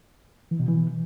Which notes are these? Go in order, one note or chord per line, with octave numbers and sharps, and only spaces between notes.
E3
B2
E3